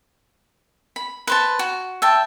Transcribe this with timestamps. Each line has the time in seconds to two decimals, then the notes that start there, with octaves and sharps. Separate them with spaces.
0.96 B5
1.27 B4 C5 A5
1.59 F#4
2.02 E5 G5 A5